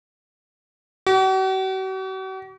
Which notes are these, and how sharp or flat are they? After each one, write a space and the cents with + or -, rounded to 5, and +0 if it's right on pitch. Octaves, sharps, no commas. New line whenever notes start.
F#4 +45